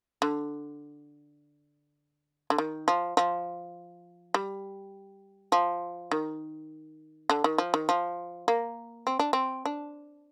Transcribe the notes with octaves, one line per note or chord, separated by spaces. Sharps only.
D3
D3
D#3
F3
F3
G3
F3
D#3
D3
D#3
F3
D#3
F3
A#3
C4
D4
C4
D4